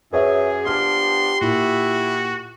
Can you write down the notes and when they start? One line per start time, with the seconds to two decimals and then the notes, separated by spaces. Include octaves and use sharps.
0.13 F#2 G#4 B4 C#5 E5
0.66 F3 B3 D4 G4 C6 F6
1.41 A#2 E4 F#4